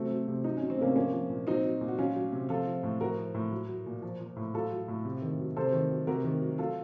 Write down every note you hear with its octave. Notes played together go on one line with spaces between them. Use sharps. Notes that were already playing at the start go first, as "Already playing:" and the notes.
Already playing: C3 F#3 A3 C4
F#3
C3
F#3 D#4
F#3 C#4
C4
C3 A#3 C#4
F3 A#3 C#4
F3
A#2
F#3 C4 D#4
F#3
A#2
F#4
F#3 C#4 F4
F#3
C3
F3 F4 A4
F3
A2
F3 F#4 A#4
F3
A2
F#3
F#3
A#2
F3
F3
A2
F#3 F4 A4
F#3
A2
C3
D#3
F#3
C3 A4 C5
D#3
F#3
C3 F#4 A#4
D#3
F#3
F#3 F4 A4